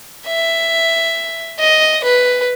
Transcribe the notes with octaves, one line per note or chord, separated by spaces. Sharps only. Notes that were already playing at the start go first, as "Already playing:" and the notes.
E5
D#5
B4